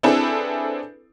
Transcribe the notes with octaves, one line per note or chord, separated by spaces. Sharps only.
C4 D4 E4 G#4 A4 B4